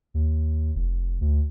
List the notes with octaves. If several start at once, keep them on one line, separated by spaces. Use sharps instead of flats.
D#2
F1
D2